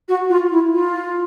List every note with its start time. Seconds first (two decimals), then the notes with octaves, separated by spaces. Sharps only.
0.08 F#4
0.29 F4
0.51 E4
0.73 F4